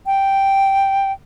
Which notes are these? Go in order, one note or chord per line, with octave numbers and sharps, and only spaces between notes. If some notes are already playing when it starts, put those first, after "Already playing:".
G5